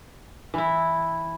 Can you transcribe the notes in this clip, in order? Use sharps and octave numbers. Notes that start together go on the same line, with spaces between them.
E3 E4